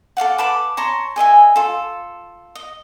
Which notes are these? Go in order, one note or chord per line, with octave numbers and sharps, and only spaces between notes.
A4 D5 F5 F#5
B4 A5 B5 D6
C#5 A5 A#5 C6
G#4 D#5 E5 G#5
F4 A4
D#5